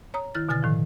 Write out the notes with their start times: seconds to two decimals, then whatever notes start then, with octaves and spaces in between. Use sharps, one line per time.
0.14 C#5 A#5 D#6
0.35 D#3 E4 F6 A6
0.49 B2 D3 G#5 F6 A6
0.63 A2 D#3 F3